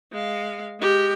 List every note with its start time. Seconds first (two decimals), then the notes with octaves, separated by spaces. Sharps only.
0.12 G#3 F5
0.80 G#3 G4